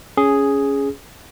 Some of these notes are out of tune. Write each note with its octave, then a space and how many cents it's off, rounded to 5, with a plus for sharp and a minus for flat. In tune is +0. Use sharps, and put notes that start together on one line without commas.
C#4 +10 G#4 +0